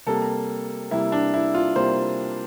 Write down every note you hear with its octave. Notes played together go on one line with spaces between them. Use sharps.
C3 G3 A#3 A4
C3 G3 A#3 E4
D4
E4
F4
C3 G3 A#3 C5